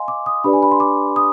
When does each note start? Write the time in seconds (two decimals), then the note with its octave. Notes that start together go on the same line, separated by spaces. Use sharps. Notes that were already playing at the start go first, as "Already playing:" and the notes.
Already playing: D#5 F5 G#5 C6
0.08 D6
0.26 D#6
0.44 D4 G4 B4 D5 B5
0.53 G#5
0.63 B5
0.71 C6
0.80 D6
1.16 D#6